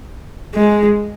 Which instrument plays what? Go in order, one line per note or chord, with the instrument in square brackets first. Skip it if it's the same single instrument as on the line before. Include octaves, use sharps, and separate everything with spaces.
[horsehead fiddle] G#3